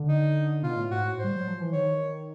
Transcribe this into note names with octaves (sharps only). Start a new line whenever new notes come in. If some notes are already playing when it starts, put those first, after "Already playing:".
Already playing: D3
D#4
B2 F4
A2
G#2 F#4
A2
C5
G3
F#3
F3
E3
D#3 C#5